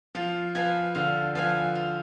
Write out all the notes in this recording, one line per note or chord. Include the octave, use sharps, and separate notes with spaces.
F3 F4
F3 B4 F5 G#5
D3 F4
F3 B4 F5 G#5
F4